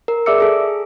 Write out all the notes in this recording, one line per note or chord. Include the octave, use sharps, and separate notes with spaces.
A#4
G#4 D5 E5 D6 E6 C#7
G#4 A4